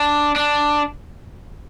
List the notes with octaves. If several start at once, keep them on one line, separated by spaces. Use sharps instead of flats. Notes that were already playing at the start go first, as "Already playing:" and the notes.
Already playing: D4
D4